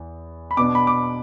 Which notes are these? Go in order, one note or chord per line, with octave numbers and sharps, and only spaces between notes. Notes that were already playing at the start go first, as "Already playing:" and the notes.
Already playing: E2 E3
B5
B2 B3 D4 D6
B5
D6